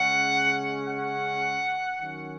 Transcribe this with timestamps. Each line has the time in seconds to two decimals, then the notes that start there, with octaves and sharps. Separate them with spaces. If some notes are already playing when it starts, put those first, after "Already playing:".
Already playing: C#3 G#3 C#4 F#5
0.88 F#5
2.00 D#3 F#3 C#4